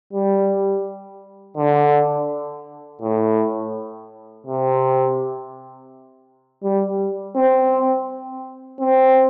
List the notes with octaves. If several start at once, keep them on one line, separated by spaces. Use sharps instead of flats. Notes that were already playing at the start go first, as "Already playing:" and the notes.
G3
D3
A2
C3
G3
C4
C4